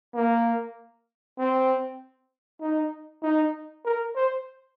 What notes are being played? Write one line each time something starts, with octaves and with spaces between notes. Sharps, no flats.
A#3
C4
D#4
D#4
A#4
C5